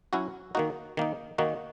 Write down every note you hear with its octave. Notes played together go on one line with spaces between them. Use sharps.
F#3 C#4 E4 F#4
D#3 A#3 D#4 F#4
D#3 A#3 D#4
D#3 A#3 D#4 F#4